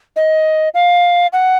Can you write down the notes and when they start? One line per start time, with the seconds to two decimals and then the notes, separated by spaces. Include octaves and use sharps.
0.16 D#5
0.74 F5
1.33 F#5